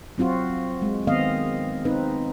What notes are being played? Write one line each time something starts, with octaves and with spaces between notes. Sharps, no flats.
F#3 C4 F4 F#4
G#3
D#3 B3 C4 D#5 F5
C4 D#4 B4